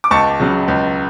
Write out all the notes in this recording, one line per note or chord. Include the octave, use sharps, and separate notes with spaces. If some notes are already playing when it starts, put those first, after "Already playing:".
D6
C#2 A5 C#6
C#3 F#3
C#2